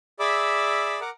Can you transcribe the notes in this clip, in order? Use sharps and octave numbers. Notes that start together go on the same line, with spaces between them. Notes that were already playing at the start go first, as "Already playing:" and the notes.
G#4 D5 E5 B5 D6 E6
A#4 F#5 A#5 D6